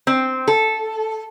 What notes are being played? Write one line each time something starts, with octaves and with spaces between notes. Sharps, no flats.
C4
A4